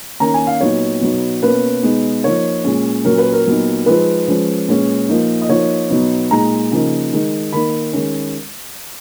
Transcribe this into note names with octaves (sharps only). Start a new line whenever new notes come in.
D#3 A#3 C#4 A#5
G#5
F5
A#2 F#3 B3 D#4 C#5
B2 F#3 B3 D#4
B2 A#3 C#4 B4
B2 G#3 B3 D#4
F3 A#3 D#4 C#5
A#2 G#3 C#4
A#2 F#3 C#4 A#4
B4
A#4
A#2 F#3 B3 D#4
F3 G#3 D#4 B4
F3 G#3 C#4
A#2 G#3 C#4
A#2 F3 A#3 D#4
D#5
F3 A#3 D#4 C#5
B2 F#3 B3 D#4
A#2 G#3 D#4 A#5
C#3 F3 A#3 D#4
D#3 G#3 D#4
D#3 A#3 D#4 B5
D#3 G#3 C#4